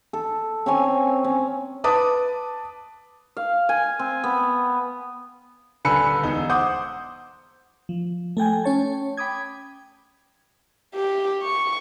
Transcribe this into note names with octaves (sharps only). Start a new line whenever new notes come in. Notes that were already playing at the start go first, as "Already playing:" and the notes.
A4
C4 C#4 C#5 G#5
C#4
B4 A5 D6 D#6
F5
G#5
C4
B3
D#1 D3 B4 G#5 E6 C#7
E1 B2 D#4
C5 F#5 C6 D6 D#6 G6
F3
A3 A4 G5 G#5
C#4 C#5 A5
G5 B5 D6 D#6 G#6
G4
C#6